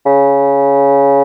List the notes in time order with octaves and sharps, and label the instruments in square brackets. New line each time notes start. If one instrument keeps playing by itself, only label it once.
[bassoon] C#3